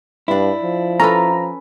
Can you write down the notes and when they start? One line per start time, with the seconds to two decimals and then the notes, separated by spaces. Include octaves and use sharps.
0.28 G2 D4 E4
0.63 F3
1.00 C#4 A4 B4 A#5